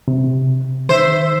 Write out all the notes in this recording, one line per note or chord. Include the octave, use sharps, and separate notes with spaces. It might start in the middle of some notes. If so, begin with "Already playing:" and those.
C3
D#3 C5 E5